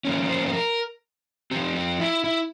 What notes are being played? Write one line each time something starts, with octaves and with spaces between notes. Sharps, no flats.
F3 A#3 C#4
C5
C5
A#4
F3 C4 G4
F4
E4
E4